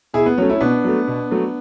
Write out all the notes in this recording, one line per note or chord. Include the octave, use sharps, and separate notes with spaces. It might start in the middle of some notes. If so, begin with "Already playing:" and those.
B2 E4 G#4
B3
F#3 A3 C#4
C#4 E4
B2 B3 D4
F#3 A3
B2
F#3 A3